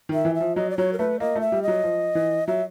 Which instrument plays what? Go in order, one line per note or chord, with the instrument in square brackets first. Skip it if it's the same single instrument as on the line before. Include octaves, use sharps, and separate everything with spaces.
[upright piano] D#3 [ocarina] E5
[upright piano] E3
[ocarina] E5
[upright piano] F3
[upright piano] F#3 [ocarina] D#5
[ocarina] D5
[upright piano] F#3 [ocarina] C#5
[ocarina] A#4
[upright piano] A3 [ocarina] B4
[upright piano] A#3 [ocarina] D#5
[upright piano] A3
[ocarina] E5
[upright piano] G3
[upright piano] F#3 [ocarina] D#5
[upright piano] F3
E3
[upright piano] F#3 [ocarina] E5